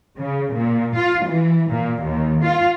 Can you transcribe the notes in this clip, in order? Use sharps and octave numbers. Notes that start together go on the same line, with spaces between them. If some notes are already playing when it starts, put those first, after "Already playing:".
C#3
A#2
F4
E3
A#2
D#2
F4